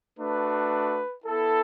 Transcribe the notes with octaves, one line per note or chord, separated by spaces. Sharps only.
A3 D4 F#4 B4
B3 E4 A4